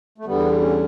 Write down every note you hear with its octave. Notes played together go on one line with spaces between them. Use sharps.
A3
E2 D3 G3 B3
C#4